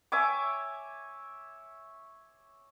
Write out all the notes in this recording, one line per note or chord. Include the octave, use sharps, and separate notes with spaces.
C#5 E5 G#5 D6